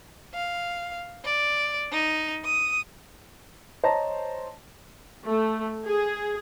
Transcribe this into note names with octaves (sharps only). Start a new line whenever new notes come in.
F5
D5
D#4
D#6
C5 C#5 D#5 A5 A#5 A#6
A3
G#4